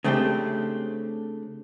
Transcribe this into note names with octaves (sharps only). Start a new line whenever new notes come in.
C#3 A3 C4 D4 G4